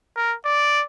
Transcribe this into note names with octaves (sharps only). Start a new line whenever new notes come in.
A#4
D5